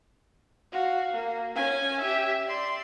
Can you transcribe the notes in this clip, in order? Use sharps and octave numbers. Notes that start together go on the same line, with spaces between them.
F#4 F5
A#3
C#4 G#5
G4 E5
D5 C6